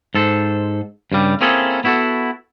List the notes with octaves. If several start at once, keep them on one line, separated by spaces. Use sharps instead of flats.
G#2 A4 C5
G2 C#3 G3
A#3 C4 C#4 E4 G#4 A4
B3 E4 F#4 G#4 A4